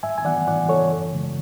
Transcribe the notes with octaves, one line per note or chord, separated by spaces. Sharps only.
G#2 E5 G#5
G#5
E3 B3 D5 F#5
G#2 D5 F#5
E3 B3 A4 C#5
F#2
C#3 E3 G#3